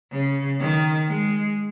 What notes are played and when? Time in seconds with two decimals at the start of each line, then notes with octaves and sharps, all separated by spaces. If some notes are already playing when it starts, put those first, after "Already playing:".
0.12 C#3
0.60 D#3
1.08 G#3